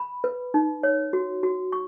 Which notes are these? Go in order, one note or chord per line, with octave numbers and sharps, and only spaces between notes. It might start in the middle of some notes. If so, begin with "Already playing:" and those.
Already playing: B5
B4
D#4
C#5
F#4
F#4
C#6